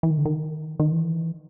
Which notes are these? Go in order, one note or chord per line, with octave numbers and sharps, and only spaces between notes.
E3
D#3
D3
D#3
D#3
E3